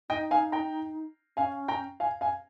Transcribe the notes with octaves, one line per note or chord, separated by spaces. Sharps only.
D#4 D#5 G5
F5 G#5
G5 A#5
C#4 F5 G#5
G5 A#5
F5 G#5
F5 G#5